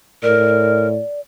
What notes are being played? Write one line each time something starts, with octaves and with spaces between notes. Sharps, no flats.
A2 A#4 D5